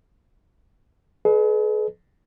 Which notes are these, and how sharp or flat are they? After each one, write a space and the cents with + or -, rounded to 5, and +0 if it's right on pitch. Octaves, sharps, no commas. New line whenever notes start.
G#4 +45 B4 +0 D#5 -35